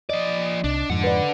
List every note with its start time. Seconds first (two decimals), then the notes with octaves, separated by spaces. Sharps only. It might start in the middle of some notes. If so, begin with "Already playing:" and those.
0.10 F3 D5 D#5
0.64 C2 D4
0.90 F2 G#2 D3 F#5
1.04 B4 D5